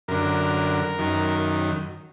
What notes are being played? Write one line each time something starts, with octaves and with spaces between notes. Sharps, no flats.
F#2 D3 A#4
F#2 D#3